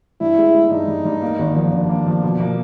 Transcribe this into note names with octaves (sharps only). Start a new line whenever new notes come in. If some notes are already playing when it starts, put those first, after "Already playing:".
G2 E4
G#3
G#3
G2 D#4
G2
G2
A#3
G#1
F3
G#1 D4
A#3
F3
B2
A#3